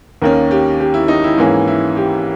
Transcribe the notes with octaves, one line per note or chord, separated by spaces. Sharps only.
D#2 D#3 A#3 C#4 A#4
G4
G4
E4
D#4
E4
G#2 E3 A#3 C#4 E4
E4
G4